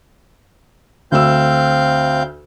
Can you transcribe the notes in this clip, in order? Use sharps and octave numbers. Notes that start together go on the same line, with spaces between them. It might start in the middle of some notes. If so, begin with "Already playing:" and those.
D2 C4 F5 E6 G6